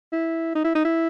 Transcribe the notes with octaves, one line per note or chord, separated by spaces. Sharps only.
E4
D#4
E4
D#4
E4